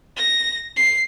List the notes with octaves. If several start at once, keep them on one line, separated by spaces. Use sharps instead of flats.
A#6
C7